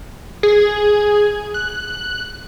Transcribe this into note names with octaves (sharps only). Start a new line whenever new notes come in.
G#4
F#6